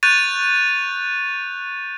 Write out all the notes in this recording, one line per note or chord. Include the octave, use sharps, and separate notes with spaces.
C#6 F#6 G6 A6 D#7 F7